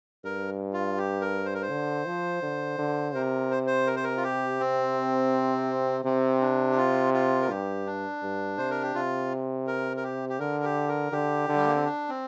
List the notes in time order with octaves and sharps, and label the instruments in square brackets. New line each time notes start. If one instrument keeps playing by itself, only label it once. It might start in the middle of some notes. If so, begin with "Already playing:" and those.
[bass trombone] G2 [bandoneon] A#4
[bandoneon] F4
G4
A#4
C5
A#4
C5
[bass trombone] D3
F3
D3
D3
[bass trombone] C3 [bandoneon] A#4
[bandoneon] C5
C5
A#4
C5
A#4
F4
G4
C4
[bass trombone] C3 [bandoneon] C4
[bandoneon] D4
G4
F4
F4
A#4
[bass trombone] G2 [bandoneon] G4
[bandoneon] D4
[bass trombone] G2
[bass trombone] C3 [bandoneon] C5
[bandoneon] A#4
G4
[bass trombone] C3 [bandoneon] F4
[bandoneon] A#4
A#4
G4
G4
[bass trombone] D3 [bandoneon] A#4
[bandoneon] G4
A#4
[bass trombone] D3 [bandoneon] G4
[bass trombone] D3
[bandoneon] G3
A#3
C4
D4
C4